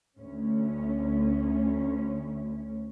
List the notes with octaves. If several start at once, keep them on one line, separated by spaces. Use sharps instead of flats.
D2 C#4